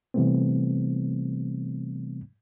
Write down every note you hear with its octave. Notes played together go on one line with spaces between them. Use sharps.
C3 E3 G3 A3 B3 C4